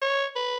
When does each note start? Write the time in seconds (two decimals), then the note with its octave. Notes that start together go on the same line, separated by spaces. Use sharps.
0.02 C#5
0.36 B4